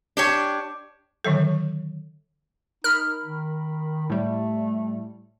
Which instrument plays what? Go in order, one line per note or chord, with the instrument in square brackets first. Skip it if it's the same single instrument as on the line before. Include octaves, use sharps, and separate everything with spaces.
[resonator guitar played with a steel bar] D4 G4 C#5
[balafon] D3 D#3 F#3 A4
[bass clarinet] D#4 [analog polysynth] A#4 B5 [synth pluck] F6
[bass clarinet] D#3
[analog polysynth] A2 G3 [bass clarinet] A3